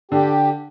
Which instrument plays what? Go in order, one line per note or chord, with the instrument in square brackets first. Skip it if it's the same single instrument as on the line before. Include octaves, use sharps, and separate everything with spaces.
[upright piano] D3 [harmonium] G4